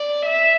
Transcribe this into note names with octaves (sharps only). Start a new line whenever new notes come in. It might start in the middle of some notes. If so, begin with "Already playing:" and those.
Already playing: D5
E5